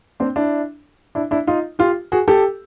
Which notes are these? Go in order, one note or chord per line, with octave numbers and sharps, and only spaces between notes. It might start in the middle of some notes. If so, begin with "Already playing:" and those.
C4 D4
D4 E4
D4 E4
D4 E4
D#4 F4
F4 G4
F#4 G#4
G4 A4